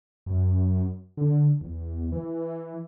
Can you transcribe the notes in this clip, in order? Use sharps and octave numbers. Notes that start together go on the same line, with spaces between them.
F#2
D3
E2
E3